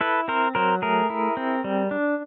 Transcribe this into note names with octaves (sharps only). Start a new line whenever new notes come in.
E4 A4 B4
C4 A#4 C5
F#3 A#4 C5
A3 G#4 A#4
E4
C4
G3
D4